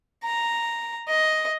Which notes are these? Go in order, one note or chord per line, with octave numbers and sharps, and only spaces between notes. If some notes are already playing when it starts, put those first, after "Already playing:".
A#5
D#5